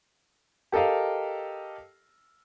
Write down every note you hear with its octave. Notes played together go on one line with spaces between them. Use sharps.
G4 A4 A#4 D#5 F5